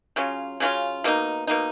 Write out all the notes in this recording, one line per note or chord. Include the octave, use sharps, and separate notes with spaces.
C#3 F#3 C#4 F4
C#3 F#3 C#4 F4
B2 A#3 D#4
B2 A#3 D#4